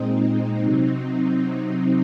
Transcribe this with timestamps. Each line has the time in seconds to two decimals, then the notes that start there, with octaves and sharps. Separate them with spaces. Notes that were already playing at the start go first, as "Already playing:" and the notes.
Already playing: A#2 G#3 C4 D#4
0.61 C3 F#3 C4